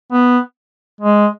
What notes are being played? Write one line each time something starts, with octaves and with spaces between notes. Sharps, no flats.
B3
G#3